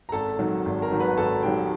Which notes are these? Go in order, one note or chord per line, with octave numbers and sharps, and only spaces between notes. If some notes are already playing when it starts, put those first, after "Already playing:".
A#5
G#1 A4 A5
G#2 D#3 F#3
G#1
A#4 A#5
G#2 D#3 F#3
B4 B5
G#1 A4 A5
G#2 D#3 F#3 G4 G5